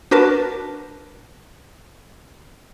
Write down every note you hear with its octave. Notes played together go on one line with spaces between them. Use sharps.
D4 F#4 A#4 B4 A5